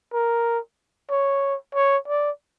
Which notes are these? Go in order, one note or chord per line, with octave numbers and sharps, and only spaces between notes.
A#4
C#5
C#5
D5